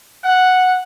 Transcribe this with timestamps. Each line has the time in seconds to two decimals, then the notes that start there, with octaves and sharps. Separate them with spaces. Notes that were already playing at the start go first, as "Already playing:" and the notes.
0.25 F#5